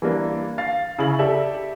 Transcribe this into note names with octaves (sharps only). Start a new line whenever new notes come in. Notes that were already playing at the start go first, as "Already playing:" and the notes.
E3 G3 A#3 D4
F5 A6 C7
C#3 C#4 E4 F#7
G4 A4 D5 E5